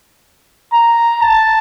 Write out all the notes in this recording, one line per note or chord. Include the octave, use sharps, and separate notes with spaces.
A#5
A5